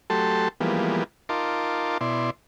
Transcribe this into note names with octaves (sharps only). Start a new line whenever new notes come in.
F#3 A3 G4 A4 A5 C6
E3 F3 G3 G#3 A#3 B3
D#4 F4 A#4 A5 C6 D6
B2 E4 D5 C6